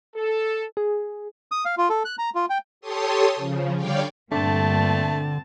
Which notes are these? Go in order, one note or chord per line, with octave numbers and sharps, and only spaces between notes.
A4
G#4
D#6
F5
F4
A4
F#6
A#5
F4
G5
G4 A4 C#5 A5 C6 D#6
C#3 F3
D3 G3 C#5 D5 F5 G5
G2 A#2 D3 A3 C4 A5